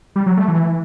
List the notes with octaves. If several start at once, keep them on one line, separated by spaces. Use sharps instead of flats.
G3
F#3
A3
E3